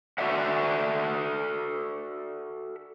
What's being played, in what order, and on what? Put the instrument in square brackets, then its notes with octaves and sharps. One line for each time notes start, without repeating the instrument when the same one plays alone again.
[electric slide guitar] F#4 A4 D5 E5 F#5